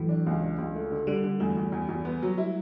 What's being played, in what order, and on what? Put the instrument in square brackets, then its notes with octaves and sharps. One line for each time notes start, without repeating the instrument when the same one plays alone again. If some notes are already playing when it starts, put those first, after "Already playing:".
Already playing: [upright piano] A2 [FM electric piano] E3 F#3
[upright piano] D4
C#2
D4
C#2
A3
D3
[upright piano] D3 [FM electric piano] G3
[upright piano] D3
[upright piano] E2 [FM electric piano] A3
[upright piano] E2
E2
E2
B3
F#3
E4